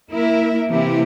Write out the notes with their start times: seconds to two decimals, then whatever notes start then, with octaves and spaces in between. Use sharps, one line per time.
0.10 A#3 E4 A#4 E5
0.69 C3 E3 A#3 E4 G4